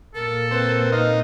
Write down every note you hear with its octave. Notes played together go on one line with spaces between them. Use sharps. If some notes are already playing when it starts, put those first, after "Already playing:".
A#2 A#3 A4 A#4
C4 B4
D#4 F5